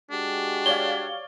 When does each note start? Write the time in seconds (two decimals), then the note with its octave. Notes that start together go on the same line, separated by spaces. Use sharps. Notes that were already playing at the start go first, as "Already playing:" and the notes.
0.11 G#3 D4 F#4 G4
0.66 C#5 D5 F5 G7